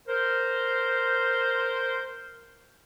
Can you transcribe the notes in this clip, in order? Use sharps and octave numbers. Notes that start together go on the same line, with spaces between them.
A#4 C5